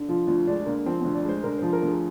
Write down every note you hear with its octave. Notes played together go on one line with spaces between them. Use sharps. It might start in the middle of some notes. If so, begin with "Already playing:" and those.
Already playing: D3
F3 F4
D2 F4
G#3 D4
D3 A#3
F3 C4
D2 C4
D4
G#3 C5
D3 A#4
F3 C5
A#4
D2 G#4